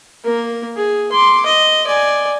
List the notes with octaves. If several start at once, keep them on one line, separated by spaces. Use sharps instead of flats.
A#3 A#4
G#4
C6 D6
D#5
D5 G#5